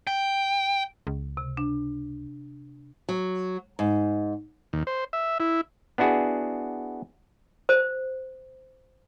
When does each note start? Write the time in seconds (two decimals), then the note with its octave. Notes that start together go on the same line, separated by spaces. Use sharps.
0.07 G5
1.07 C#2
1.37 C3
1.57 D4
3.09 F#3
3.79 G#2
4.73 D#2
4.87 C5
5.13 E5
5.40 E4
5.98 B3 D4 E4 F#4 G#4
7.69 C5